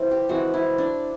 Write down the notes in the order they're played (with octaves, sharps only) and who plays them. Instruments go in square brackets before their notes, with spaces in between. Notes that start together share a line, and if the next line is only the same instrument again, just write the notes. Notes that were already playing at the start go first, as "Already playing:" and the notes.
Already playing: [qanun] E3 C4
G4
E3 G#3 C4 F#4
E4
D4